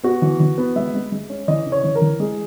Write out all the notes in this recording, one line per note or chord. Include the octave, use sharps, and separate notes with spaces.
B3 F#4
E3
E3
B3
G#3 E5
G#3
G#3
C#4
E3 D#5
C#3
C#5
E3
A#4
E3
G#3 G#4